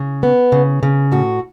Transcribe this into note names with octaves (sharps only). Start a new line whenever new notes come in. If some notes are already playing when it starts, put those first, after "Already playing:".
Already playing: C#3
B3
C#3
C#3
A2 F#4